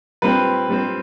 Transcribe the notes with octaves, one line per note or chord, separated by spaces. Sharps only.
A#2 G3 C4 B4
A#2 G3 C4